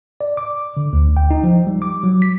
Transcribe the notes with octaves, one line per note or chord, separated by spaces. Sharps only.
D5
D6
D3
D2
G5
D#4
F3
G3
D6
F#3
B6